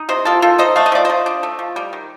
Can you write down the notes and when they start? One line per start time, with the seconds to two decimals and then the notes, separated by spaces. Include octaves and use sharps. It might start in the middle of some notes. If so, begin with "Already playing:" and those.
Already playing: D#4
0.09 C3 C5 D#5
0.25 A#3 F4 A4
0.42 D#3 F4 A4
0.58 D#4 C5 D#5
0.76 A3 F5
0.86 D#5
0.92 F3 D5
1.05 F3 C5 D#5
1.26 D4
1.43 A3
1.59 F3
1.76 G3
1.93 D#3